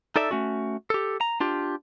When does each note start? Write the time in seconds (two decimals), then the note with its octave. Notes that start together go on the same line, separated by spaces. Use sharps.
0.16 D#4 A4 D5 E5
0.31 A3 C#4 F#4
0.90 G4 A4
1.21 A#5
1.40 D4 F4 G4